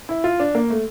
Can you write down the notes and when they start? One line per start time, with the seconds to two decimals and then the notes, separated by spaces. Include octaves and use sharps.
0.09 E4
0.24 F4
0.40 D4
0.55 A#3
0.70 A3